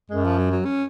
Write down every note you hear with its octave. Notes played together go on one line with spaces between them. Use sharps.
F#2 G#3
F3
F#3
F#3
C#4